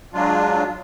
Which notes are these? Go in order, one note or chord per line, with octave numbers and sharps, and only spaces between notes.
F#3 G#3 D4 F4